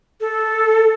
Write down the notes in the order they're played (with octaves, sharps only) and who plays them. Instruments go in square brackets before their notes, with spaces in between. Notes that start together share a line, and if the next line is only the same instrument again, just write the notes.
[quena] A4